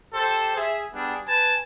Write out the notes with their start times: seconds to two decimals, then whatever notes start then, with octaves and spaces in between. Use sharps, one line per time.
0.14 G4 A4 C5
0.56 G#4 E5
0.93 G3 B3 D4 G#4
1.27 B4 G#5 A5